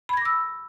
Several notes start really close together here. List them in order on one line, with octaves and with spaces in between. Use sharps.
B5 G#6 A#6 D6 E6